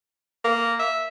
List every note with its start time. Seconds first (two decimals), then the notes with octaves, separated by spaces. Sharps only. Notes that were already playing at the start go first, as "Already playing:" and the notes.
0.44 A#3
0.79 E5